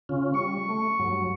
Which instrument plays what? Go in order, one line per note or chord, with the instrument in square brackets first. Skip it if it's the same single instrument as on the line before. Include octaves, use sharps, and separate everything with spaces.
[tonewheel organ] C#3 C#4 F4
[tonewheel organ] G3 [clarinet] C#6
[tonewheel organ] A3
G2 F#3